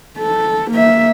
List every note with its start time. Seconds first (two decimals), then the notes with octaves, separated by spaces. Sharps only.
0.19 A4
0.71 A#3 E5